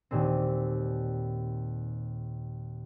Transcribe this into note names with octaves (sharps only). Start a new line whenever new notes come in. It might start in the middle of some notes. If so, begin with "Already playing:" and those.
D#2 A#2 C4